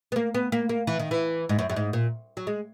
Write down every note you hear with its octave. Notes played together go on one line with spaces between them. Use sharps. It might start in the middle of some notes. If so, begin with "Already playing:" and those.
B3
A#3
B3
A#3
A#3
E3
D#3
E3
G#2
F#2
F#2
G#2
A#2
F#3
G#3